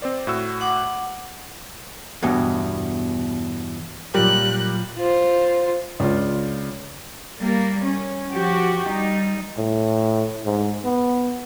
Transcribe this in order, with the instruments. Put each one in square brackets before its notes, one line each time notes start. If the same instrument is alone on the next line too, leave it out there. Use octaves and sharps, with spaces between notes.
[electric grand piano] C4 C5 D5
A2 F#4 E6
[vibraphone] F#5 D6
[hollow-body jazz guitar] E2 G2 B2
[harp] A#2 F#3 F4 [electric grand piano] G3 G4 A#4 [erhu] F#6
[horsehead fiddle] F4 C5
[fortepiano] C#2 D4 F4
[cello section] G3 A#3
C#4
F3 F#4 G4
G3 D#4
[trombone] A2
G#2
B3